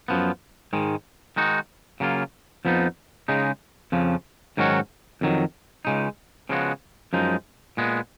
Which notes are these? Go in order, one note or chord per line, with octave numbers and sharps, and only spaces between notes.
F#2 F3 B3
G#2 D#3 G#3
D#3 G#3 D#4 F#4
C#3 F#3 A#3 F4
F2 F3 B3 D#4
C#3 G#3 D#4
F2 C#3 F3
G#2 D#3 F#3 C#4 F#4
F2 D#3 F#3
C#2 C#3 G#3 D#4
C#3 F3 G#3 B3 F#4
F#2 F3 G#3 D#4
A#2 G#3 B3